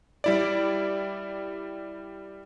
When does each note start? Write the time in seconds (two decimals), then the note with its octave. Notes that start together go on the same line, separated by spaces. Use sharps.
0.24 G3 E4 D5